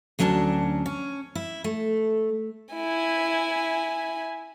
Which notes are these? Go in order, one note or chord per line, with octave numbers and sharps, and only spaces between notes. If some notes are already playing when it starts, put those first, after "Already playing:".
D2 F#3 C#4 D4 A5
C#4
E4
A3
E4 G#5